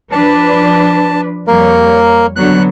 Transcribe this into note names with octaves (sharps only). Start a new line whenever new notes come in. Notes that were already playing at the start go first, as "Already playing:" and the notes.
F3 D4 B4 A5
F2 G3 A#3 A#4 C#5
D3 F#3 B3 F#6